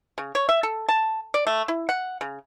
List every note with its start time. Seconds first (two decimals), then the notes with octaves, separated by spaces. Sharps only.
0.18 C#3
0.35 C#5
0.49 E5
0.63 A4
0.89 A5
1.34 D5
1.47 A3
1.68 E4
1.89 F#5
2.21 C#3